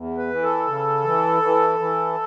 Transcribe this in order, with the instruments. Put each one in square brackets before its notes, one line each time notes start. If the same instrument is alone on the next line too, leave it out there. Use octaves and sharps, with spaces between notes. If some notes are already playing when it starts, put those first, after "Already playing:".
Already playing: [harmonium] E2
B4
E3
A4
C#3
E3
E3
E3